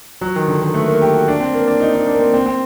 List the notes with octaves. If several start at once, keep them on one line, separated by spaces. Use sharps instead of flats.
F#3
D#3
D3
D#3
A3
A#3
G4
F#4
D4
C4
A#3
D4
D#4
D#4
D4
A#3
C4
C4
C4